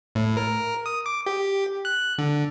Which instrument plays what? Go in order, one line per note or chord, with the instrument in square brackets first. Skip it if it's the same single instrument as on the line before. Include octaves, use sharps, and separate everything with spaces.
[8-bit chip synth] A2
A#4
D#6
D6
G4
F#6
D3